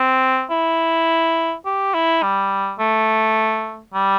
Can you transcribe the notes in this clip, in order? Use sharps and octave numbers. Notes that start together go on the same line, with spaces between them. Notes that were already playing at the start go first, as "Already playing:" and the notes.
Already playing: C4
E4
G4
E4
G3
A3
G3